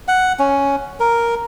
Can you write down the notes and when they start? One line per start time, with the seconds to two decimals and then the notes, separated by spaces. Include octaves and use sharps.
0.08 F#5
0.39 C#4
1.00 A#4